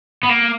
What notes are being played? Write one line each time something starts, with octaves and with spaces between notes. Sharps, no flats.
B3
A#3